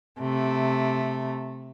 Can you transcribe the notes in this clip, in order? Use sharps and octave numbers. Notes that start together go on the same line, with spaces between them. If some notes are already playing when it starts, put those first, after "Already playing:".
C3 A3